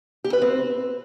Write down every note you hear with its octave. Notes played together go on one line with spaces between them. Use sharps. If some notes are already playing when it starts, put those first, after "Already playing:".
G4
B4
C4